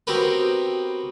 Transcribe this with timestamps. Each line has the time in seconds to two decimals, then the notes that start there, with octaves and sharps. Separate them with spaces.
0.07 B3 C4 F#4 G4 A#4 B4